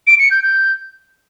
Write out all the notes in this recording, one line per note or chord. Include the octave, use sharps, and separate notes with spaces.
D7
C#7
G6
G6